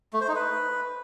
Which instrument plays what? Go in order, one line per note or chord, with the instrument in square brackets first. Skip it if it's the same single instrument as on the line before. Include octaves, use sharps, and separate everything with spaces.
[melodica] A3
C5
D#4
B4